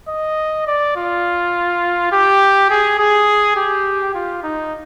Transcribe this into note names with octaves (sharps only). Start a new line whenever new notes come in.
D#5
D5
F4
G4
G#4
G#4
G4
F4
D#4